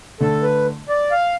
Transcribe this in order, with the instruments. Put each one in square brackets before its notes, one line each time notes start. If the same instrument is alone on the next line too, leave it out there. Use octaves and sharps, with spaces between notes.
[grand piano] D3 A3 D4 [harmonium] A4
[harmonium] B4
D5
F5